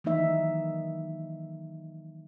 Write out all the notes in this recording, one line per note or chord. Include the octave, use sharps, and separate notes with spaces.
D#3 E3 F#3 A#3 D#4 E5